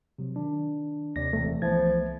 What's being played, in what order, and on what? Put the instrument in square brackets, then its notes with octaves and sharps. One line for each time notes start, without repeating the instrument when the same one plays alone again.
[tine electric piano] C3 F#3
D#3 D4
[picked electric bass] D#2 [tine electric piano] C3 D5 A#6
[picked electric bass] D#1 D#2 C3 [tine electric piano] E3 [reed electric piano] A3
[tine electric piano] C2 G#6 A6 [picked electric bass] E3 B3 [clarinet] F3